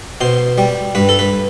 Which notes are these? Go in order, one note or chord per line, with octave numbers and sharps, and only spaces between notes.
B2 C5
G3
G2 B4
A4
B4